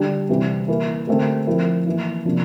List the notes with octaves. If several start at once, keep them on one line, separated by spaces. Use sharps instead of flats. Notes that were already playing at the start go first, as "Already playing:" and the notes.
Already playing: D3 G3 D4 G4
C3 E3 G3 C4
E3 A#3 E4 A#4
D3 A3 C4 G4 A#4
F3 C4 E4 A#4
E3 A#3 E4
C3 F3 A#3 D4 F4